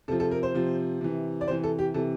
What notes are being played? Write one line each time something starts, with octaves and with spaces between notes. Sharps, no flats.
C3 F3 A4
A4
A#4
C5
C3 F3
C3 E3
D5
C3 E3 C5
A4
G4
C3 E3 A4